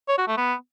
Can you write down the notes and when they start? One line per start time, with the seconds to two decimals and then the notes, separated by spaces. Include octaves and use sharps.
0.08 C#5
0.18 F#4
0.28 A3
0.37 B3